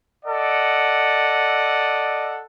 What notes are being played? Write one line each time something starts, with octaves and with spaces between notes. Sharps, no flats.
A4 D5 D#5 F#5